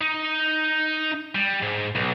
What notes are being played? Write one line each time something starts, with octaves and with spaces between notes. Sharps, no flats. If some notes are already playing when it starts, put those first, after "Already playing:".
D#4
G3
G#2
B1